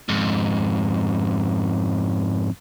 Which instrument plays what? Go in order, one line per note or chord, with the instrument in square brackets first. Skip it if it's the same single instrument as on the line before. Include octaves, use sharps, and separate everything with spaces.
[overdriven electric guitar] F2 G#2